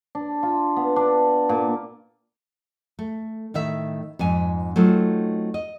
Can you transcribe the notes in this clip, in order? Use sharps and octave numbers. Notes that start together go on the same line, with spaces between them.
D4
F4
B3
D4
A#2
A3
A2 D#3 E5
F2 G#2 G#5
F#3 A3 C4 D#4 F4
D#5